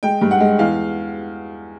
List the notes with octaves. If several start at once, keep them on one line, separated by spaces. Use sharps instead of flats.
G#3 G5
G2
F#5
G#3
E2 F5